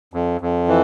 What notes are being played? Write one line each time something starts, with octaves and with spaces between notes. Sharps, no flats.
F2
F2
E3